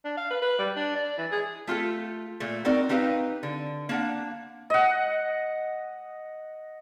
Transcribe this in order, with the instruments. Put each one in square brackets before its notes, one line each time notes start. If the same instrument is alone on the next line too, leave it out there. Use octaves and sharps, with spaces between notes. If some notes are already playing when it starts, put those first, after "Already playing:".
[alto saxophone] D4
F5
B4
B4
G3
D4
D5
E3
G#4
[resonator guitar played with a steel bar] A3 F4 G4 A4
A#2 A3
C4 D#4 F#4 A#4 D5
C4 D#4 G4 B4 D#5 F5
D3
A#3 D4 F#5
[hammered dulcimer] D#5 F#5